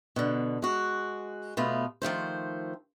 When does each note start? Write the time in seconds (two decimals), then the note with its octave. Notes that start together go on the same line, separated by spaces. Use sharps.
0.16 B2 D3
0.62 G#3 F#4
1.57 B2 A3 B3 F4
2.02 D#3 F3 A3 C5